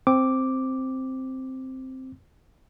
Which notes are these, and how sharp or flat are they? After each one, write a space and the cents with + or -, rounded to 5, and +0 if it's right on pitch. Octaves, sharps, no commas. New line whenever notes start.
C4 +0 D6 +0